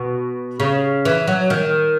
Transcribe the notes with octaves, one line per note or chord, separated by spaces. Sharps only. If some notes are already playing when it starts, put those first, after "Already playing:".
Already playing: B2
C#3
E3
F#3
D#3